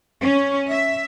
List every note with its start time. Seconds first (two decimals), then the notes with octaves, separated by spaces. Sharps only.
0.23 C#4
0.70 E5